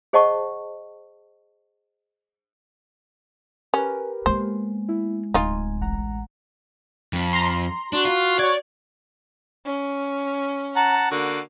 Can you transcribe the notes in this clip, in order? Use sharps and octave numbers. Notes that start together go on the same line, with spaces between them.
G#4 C5 D#5 F#5 A5 C#6
C#4 G4 A#4 B4
G#3 A#3 B3 C5
E4
D1 D#4 F4 G#5
A1 F#5 A#5
F2
A#5 C6
D4 F#4
F4
C#5 D5 G#6
C#4
F#5 A5 A#5
D3 A#3 F#4